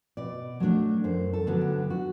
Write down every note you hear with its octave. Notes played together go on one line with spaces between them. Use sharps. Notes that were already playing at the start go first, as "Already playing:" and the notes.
B2 D5
F#3 A3 D4
F#2 C5
A4
D3 F#3 B3 D4
G4
F#4